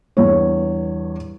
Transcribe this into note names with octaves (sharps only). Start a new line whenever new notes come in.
E2 G2 C#5